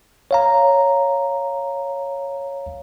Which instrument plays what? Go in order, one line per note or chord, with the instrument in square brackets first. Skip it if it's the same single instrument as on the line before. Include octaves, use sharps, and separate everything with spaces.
[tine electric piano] C#5 F5 A#5